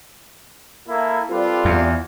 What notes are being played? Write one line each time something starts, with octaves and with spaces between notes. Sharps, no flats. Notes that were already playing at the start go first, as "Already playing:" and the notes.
A#3 E4 A4
G3 C4 F4 A4 B4 D5
E2